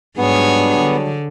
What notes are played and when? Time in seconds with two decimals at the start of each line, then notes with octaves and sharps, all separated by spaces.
0.17 G#2 F#3 G3 B3 D4 G#4 C#5
0.78 D3